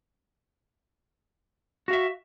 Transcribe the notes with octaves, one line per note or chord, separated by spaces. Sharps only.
F#4 E5 F5